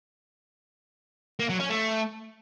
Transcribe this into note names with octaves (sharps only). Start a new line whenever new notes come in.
A#3
F#3
C#4
A3